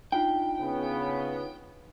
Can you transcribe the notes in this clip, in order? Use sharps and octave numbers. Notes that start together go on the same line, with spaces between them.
D4 D#4 F4 G5
C#3 B3